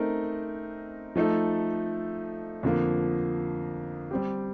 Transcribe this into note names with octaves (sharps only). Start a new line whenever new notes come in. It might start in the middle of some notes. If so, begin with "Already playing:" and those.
Already playing: A3 C4 D#4 A#4
F3 A3 D#4 A4
F2 D3 F3 A#3
G3 C4 G4